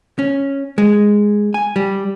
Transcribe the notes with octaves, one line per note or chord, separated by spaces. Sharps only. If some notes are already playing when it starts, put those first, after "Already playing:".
C#4
G#3
G#5
G3